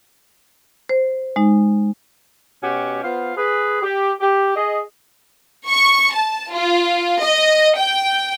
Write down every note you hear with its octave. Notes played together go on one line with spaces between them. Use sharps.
C5
G#3 D#4
B2 C#4 F#4 G4
B3 F4 C5 F5
G#4 B4
G4
G4
G#4 D#5
C#6
A5
F4
D#5
G5